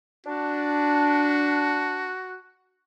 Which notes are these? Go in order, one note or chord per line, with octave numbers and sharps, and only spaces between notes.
D4 F#4